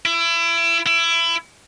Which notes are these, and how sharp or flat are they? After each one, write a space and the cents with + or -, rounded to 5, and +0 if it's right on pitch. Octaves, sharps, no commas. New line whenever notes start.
E4 +30
E4 +25